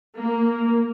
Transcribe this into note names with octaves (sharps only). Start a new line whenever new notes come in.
A#3